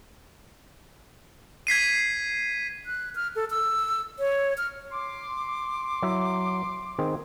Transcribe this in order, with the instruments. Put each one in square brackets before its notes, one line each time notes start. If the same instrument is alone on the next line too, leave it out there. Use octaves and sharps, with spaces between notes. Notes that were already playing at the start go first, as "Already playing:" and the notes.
[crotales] G#6 B6 C7 D#7
[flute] F#6
F6
A4
E6
C#5
F6
[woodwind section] C6 D6
[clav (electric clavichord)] F#3 E4 E5
D#3 C4 G#4